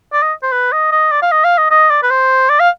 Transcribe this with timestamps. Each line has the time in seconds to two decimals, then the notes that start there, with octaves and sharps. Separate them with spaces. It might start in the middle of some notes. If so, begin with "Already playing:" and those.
0.13 D5
0.23 D#5
0.43 C5
0.52 B4
0.72 D#5
0.92 D#5
1.12 D5
1.22 F5
1.32 D#5
1.44 F5
1.58 D#5
1.71 D#5
1.90 D5
2.03 B4
2.10 C5
2.49 D5
2.60 F5